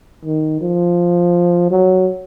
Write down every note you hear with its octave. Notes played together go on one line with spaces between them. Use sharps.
D#3
F3
F#3